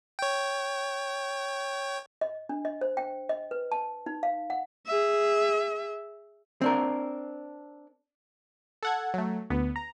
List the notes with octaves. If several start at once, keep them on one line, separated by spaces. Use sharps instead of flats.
C#5 G5
D#5
D4
D#5
C5
G5
D#5
B4
A5
D#4
F5
F#5
G#4 E5
C4 D4 A#4
A4 F#5 G#6
F#3 A3
D2 B3
A#5